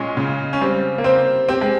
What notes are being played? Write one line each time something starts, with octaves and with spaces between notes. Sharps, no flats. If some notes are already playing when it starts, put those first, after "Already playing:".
Already playing: A#2 G#3 C#4
C#3
C#4
G3 C4
A#3
C4 C5
C4 G4
G#3